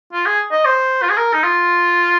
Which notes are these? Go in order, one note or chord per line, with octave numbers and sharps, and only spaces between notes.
F4
G#4
D#5
C5
F4
G#4
A#4
D#4
F4